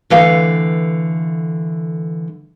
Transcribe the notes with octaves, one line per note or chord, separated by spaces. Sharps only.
D3 E3 A3 F5